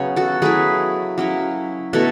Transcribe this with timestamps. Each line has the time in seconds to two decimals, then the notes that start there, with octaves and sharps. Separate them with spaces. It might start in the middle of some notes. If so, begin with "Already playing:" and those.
Already playing: C#3 F#3 B3 C#5
0.16 F#4 A4
0.42 F#3 A3 E4 G#4 B4
1.18 F#3 C#4 E4
1.93 B2 A3 E4 F#4 A4